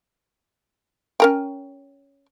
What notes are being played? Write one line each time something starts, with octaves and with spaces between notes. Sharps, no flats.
C#4 A#4 G5